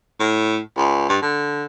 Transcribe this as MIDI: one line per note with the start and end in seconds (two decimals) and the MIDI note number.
0.20 0.60 45
0.77 1.08 37
1.09 1.18 43
1.22 1.65 50